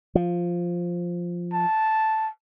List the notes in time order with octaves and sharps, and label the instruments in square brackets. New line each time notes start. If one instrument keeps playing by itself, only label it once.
[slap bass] F3
[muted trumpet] A5